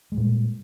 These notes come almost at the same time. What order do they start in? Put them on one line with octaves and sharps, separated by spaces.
G#3 G3 A#2